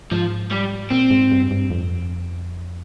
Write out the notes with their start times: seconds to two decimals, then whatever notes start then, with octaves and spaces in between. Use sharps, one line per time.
0.11 G#2 F3
0.51 G3
0.90 A#2 C4
1.11 G#2
1.32 G2
1.51 G2
1.71 F2